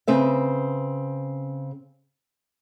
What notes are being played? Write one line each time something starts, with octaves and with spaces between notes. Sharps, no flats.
C#3 C4 B4 E5